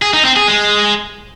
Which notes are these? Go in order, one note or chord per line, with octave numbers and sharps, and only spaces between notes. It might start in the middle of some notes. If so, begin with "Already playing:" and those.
G#4
D#4
C4
G#4
G#3